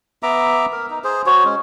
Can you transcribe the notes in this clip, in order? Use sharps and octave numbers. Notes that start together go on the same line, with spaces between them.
B3 E5 A#5 D6
A#4
D#4
G#4 C5
F#4 C5 C#5
G#3 C#4